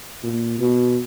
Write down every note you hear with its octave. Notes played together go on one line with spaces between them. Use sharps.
A#2
B2